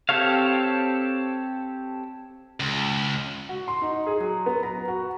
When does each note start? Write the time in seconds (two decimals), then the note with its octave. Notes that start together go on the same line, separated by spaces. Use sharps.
0.09 C4 G4 A4 C#5 F5
2.60 C#2
3.49 F#4
3.68 C6
3.82 D#4
4.07 G#4
4.20 F#3
4.46 B3
4.63 A#5
4.88 F#4